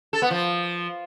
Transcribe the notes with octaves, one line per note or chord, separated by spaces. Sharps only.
A4
B3
F3